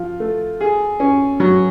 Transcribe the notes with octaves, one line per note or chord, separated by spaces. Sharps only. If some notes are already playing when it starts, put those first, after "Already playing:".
Already playing: F3
A3
G#4
C#4
F#3